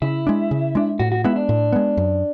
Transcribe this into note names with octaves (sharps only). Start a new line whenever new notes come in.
C#3 E4
G#3 D4
C#3
G#3 D4
A2 F#4
F#4
G#3 B3 E4
D4
A2
G#3 B3
F#2